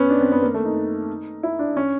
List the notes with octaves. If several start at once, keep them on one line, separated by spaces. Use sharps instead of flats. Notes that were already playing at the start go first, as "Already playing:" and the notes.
Already playing: B3 C#4
D4
C4
B3
A#3
A3
D#4
E4
D4
C#4